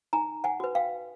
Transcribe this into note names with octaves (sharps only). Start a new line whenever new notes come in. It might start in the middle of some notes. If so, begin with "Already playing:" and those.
D#4 G#5 A#5
F#5 G#5
F#4 B4
F5 G5